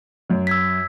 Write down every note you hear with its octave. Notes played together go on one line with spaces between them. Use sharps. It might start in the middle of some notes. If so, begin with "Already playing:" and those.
F#2 F#3
E6 G#6 B6